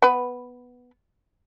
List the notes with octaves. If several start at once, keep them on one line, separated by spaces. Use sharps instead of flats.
B3 B4